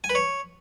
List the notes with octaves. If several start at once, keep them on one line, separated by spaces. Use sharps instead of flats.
G#5
B4
C#5